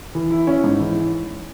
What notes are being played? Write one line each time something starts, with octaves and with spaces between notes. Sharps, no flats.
E3
E4
C#4
G#2
E3